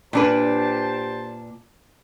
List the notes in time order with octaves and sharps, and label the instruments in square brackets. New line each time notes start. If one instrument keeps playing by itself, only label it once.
[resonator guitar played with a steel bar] A#2 D4 B4 [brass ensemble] G4 C5 A5